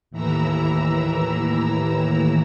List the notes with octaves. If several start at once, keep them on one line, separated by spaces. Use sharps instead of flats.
D#2 A2 E3 E4 A#5 E6